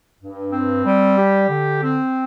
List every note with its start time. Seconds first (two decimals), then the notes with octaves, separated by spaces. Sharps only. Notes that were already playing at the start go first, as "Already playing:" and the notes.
0.21 G2
0.52 C4
0.85 G3
1.17 G4
1.49 D3
1.82 C4